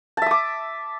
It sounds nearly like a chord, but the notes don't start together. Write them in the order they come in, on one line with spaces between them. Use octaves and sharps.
A5 E5 D#6 D6